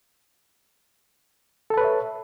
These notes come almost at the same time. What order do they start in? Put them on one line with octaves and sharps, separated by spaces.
A4 A5 B4 C#5 E5